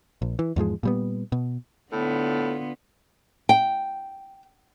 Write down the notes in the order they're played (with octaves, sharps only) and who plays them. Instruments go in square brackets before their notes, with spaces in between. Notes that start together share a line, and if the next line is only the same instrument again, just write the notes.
[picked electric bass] A#1
E3
E2 G#2 F3 G#3
A#2 G3 B3
B2
[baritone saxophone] A2 [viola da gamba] D3 B3 F4
[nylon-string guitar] G5